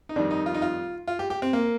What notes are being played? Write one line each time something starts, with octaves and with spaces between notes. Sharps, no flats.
D#4
F2 D#3 G3 D4
D#4
F4
D#4
F4
F4
G4
G4
C4
A#3